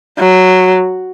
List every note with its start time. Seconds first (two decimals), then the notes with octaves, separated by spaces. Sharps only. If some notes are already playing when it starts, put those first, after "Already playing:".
0.19 F#3